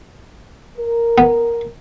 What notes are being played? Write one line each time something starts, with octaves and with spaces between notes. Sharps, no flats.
A#4
B3